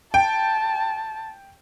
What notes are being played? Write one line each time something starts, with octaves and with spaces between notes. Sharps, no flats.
G5 A5